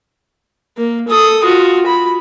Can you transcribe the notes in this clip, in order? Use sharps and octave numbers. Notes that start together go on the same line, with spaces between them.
A#3
A4 D#6
F4 F#4
B5